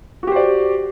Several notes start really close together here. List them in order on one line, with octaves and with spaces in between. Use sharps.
F#4 G4 C5 D5